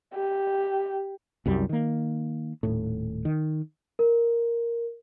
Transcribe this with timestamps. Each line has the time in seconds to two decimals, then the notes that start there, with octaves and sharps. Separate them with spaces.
0.14 G4
1.46 C2 F#2 G3
1.69 D#3 A#3
2.63 D#1 A2
3.25 D#3
3.99 A#4